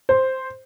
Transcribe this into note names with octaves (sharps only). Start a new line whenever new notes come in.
C5